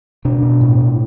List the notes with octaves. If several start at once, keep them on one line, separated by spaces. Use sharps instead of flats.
B2 D4
B2
A2
A2